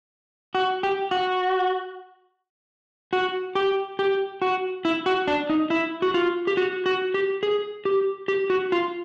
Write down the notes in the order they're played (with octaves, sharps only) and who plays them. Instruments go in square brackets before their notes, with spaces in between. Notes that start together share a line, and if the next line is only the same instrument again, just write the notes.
[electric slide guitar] F#4
G4
F#4
F#4
G4
G4
F#4
E4
F#4
D4
D#4
E4
F#4
F4
G4
F#4
F#4
G4
G#4
G4
G4
F#4
F4